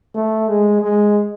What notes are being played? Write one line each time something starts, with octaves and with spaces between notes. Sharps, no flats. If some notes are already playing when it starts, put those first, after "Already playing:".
A3
G#3
G#3